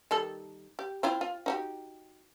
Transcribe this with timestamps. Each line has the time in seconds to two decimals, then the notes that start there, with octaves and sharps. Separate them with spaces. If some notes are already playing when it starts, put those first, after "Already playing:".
0.11 D#3 G3 A4
0.79 G4
1.03 C4 E4 F4
1.21 F4
1.46 D#4 F#4 G4